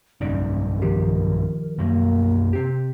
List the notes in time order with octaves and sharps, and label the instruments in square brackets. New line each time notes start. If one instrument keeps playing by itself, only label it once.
[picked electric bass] B1 G2 C#3 [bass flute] C#4 [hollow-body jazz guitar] D#4 D5
[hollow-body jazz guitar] D#3 F3 G4 [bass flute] A#4
[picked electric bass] F#2 B2 F#3 [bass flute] A#3
[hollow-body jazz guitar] C3 C4 G4